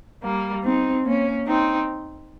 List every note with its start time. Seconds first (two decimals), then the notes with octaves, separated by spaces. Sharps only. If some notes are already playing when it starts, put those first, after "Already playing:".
0.24 G3 A#3
0.64 C4 D#4
1.06 A#3 C#4
1.47 C4 D#4